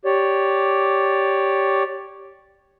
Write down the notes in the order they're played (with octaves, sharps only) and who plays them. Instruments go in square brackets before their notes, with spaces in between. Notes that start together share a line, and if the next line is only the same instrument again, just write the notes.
[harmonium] G4 C#5 D5